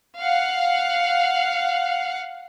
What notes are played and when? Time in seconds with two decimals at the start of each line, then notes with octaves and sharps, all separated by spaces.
0.19 F5 F#5